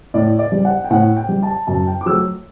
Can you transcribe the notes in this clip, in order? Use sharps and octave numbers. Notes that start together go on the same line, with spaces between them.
A2 D5
D5
G3
F#5
G5
A2 F#5
G5
G3
A5
F#2 A5
G5
D6
F#3 A3 E6